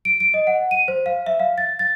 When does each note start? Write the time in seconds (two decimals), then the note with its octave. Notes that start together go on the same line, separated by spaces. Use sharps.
0.05 D7
0.20 D7
0.34 D#5
0.47 F#5
0.71 D#7
0.88 C5
1.06 F5
1.26 E5
1.40 F5
1.58 A6
1.79 A6